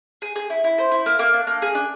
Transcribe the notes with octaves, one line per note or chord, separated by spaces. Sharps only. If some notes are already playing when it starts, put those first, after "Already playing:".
G#4
G#4
E4
E4
C5
E4
A#3
A#3
D4
A#3
G#4
D4